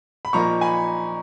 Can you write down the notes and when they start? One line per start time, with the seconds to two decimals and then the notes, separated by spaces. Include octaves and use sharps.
0.25 B5
0.33 A#2 F3 A#3 D#4 A#5 C#6
0.61 G#5 B5